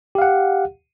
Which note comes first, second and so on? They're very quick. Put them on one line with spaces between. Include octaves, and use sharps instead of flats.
G4 F5 F#5